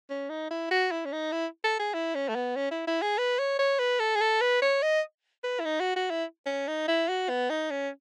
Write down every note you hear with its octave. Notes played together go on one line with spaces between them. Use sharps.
C#4
D#4
E4
F#4
E4
C#4
D#4
E4
A4
G#4
E4
C#4
A3
B3
C#4
E4
E4
G#4
B4
C#5
C#5
B4
A4
G#4
A4
B4
C#5
D#5
B4
E4
D#4
F#4
F#4
E4
C#4
D#4
E4
F#4
B3
D#4
C#4